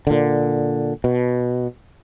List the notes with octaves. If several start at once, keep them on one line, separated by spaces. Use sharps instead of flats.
A#2 D3
B2